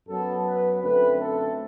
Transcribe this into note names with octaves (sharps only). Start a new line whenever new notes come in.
F#2 F#3 B3 A4
B4
F#2 D3 A3 C4 B4
A4